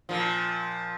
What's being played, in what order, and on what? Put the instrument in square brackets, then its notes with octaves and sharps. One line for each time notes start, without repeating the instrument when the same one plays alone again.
[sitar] A#2 F3